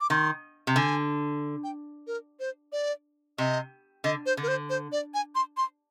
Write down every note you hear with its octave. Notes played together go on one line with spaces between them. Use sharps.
D6
D#3 C6
C3
D3 G#5
G5
A#4
C5
D5
C3 D#5
D3 D#5
C5
D3
A#4
C5
C5
D5
G#5
C6
C6